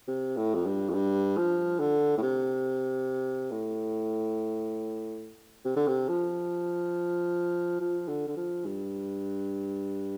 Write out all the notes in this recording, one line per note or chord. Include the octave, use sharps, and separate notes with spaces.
C3
A2
F2
G2
F2
G2
F3
D3
A2
C3
A2
C3
D3
C3
F3
F3
D3
D3
F3
G2